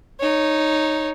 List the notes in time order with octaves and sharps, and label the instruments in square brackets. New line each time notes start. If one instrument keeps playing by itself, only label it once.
[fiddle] D#4 C#5